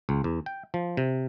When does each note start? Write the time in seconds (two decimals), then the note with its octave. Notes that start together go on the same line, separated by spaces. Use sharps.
0.09 C#2
0.24 E2
0.46 G5
0.74 F3
0.97 C3